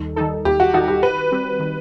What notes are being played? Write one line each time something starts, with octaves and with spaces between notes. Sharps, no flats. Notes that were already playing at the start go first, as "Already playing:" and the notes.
Already playing: D#2 D#3 G3 D#4 A4
D#3 G3 D#4 A4
D#2 G4
F#4
D#3 G3 D#4 F#4 A4
G4
D#3 B4
G3 C4
D#3